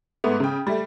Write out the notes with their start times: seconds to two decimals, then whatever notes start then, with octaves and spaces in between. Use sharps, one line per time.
0.24 G#2 A3 B3
0.40 C#3 G5
0.67 G3 A3